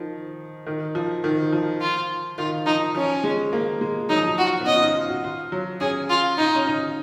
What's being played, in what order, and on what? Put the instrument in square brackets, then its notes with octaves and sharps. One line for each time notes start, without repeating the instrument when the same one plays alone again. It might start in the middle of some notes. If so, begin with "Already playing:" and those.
Already playing: [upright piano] D#3 F3
D#3
F3
D#3
F3
[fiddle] F4
[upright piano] D#3 [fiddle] F4
[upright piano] F3 [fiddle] D#4
[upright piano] F3 [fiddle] C#4
[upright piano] G#3
A#3
G#3
[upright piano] F#3 [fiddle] D#4
[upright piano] F3
F#3
[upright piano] F4 [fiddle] F#4
[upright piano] B3
[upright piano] C#4 [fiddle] D#5
[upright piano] F4
D#4
F4
F#4
F4
F#3
[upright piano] C#4 [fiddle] G#4
[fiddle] F4
[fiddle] D#4 [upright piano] F4
[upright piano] C#4
D#4